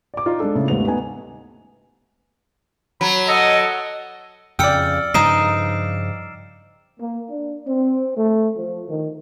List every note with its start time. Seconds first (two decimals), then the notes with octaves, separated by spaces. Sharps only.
0.14 D5 D6
0.26 D#4 F4 D5
0.40 G#3 D4 A4
0.55 A2 C#3
0.68 D#2 G#2 A3 B3 F7
0.87 A3 B3 D#4 G#5
3.01 F#3 B5
3.28 A4 D#5 F#5
4.59 F2 C#3 D5 G5 E6 F6 C#7
5.14 G2 C#3 F3 D#4 D#5 C7 D7 E7
6.99 A#3
7.30 D4
7.68 C4
8.17 A3
8.57 F3
8.89 D#3